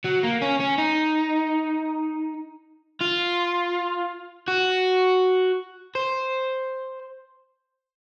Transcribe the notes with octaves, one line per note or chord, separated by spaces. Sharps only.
F#3
A#3
C#4
C#4
D#4
F4
F#4
C5